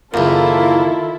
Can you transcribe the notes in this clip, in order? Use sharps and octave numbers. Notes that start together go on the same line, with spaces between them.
C#2 F#2 D#3 A#3 E4 F4 A4